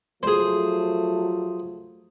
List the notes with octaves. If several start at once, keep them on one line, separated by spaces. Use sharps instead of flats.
F3 F#3 A3 G#4 C5